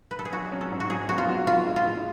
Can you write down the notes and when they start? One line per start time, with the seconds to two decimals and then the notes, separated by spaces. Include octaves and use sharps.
0.11 B4
0.19 A4
0.25 G#4
0.32 F#3 F#4
0.52 C#4
0.61 A4
0.71 G#2
0.80 F#4
0.90 F#3 G#4
1.09 B3 F#4
1.18 F4
1.29 F#4
1.47 F4 F#4
1.67 G#3
1.76 F4
1.85 A2